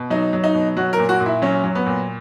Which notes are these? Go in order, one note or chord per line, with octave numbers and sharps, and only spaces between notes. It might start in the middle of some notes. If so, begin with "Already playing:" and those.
Already playing: B2
F#3 D#4
F#3
D#4
B2
F#3 F#4
A#4
A#2
F#4
A#2
E4
F#3 C#4
F#3
B3
A#2